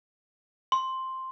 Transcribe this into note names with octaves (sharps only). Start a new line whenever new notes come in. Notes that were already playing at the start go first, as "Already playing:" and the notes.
C6